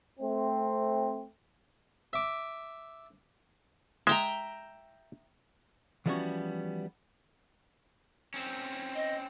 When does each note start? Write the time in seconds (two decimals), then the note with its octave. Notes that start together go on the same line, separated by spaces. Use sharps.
0.20 A3 C4
2.13 E5 D6
4.07 G#3 E5 G5 A#5
6.06 E3 F3 G3 B3 C#4 F#4
8.34 C4 C#4
8.95 D#5